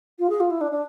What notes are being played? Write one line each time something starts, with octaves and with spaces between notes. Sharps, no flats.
F4
G#4
F4
E4
D4
D4